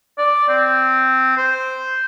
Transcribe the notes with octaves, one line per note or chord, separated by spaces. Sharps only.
D5
C4
C5